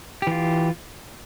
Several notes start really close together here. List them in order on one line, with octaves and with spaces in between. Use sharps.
G4 E3 F4